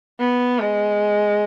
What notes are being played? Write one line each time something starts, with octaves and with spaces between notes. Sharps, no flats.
B3
G#3